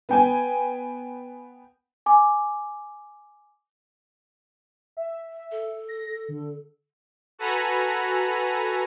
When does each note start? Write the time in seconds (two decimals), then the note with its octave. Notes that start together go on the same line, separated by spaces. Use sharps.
0.09 B3 G5 G#5
2.06 G#5 D6
4.97 E5
5.51 A4
5.88 A#6
6.28 D3
7.39 F#4 A4 B4 F#5 G#5 A#5